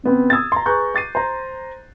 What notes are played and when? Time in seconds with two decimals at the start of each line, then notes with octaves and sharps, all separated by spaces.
0.04 C#3 B3 C4
0.30 D#6 E6 G#6 A6
0.52 A#5 C6
0.66 G#4 B4 A#5 C#6 F#6 G6
0.95 D6 A6 C7 D#7
1.15 C5 A#5